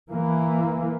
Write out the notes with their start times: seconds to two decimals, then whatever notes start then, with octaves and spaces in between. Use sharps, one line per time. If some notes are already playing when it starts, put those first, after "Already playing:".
0.11 E3 A#3